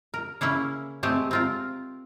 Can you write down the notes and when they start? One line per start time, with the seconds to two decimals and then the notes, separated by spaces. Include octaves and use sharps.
0.14 A#4
0.41 C#3 A#3 C#4 E4
1.03 G#3 A3 C4 G4
1.31 C4 F4 A#4